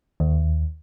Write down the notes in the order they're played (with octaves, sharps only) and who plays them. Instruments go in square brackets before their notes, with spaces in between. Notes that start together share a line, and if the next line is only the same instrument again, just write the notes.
[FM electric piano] D#2